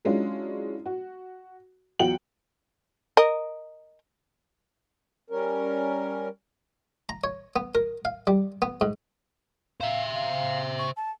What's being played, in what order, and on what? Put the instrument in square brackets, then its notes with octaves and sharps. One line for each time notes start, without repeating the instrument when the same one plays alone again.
[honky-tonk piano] F#3 G#3 C#4 D4 E4 F4
F#4
E2 F#3 F4 F#5 G5 F#7
[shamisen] A#4 D#5
[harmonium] G3 C#4 A#4
[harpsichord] A#5
C#5
B3
A#4
F5
G3
B3
G#2
[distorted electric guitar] C5 E5 [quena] F5
[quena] F5
C#6
A5